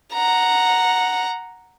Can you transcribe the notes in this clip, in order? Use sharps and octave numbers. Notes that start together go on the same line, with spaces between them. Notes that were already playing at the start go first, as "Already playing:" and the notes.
F#5 A#5